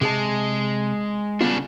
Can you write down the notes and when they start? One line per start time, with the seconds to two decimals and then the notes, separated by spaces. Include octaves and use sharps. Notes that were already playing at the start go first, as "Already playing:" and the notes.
0.01 C3 G#3 G#4 A5
1.41 C#3 G3 B3 D4 F4